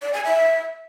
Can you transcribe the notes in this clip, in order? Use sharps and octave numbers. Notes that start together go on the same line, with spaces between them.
D5
G#5
E5